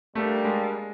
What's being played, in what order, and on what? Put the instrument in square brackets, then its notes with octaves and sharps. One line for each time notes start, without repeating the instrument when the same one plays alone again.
[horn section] G3 A#3 D4 [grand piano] A3
[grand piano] G#3